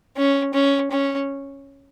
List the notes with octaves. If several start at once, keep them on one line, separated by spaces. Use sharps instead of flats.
C#4
C#4
C#4